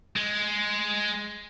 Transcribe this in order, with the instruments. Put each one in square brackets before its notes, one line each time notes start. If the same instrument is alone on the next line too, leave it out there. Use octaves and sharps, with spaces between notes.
[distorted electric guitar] G#3